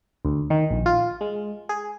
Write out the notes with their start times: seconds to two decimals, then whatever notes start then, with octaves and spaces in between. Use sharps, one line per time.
0.25 D2
0.50 D#3
0.71 A#1
0.86 F4
1.21 G#3
1.69 G#4